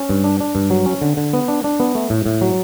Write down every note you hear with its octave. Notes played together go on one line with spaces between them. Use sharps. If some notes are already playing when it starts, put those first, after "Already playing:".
Already playing: C#4
G2
D4
D4
G2
F#3
C#4
D3
D3
B3
D4
D4
B3
A3
A2
A2
F#3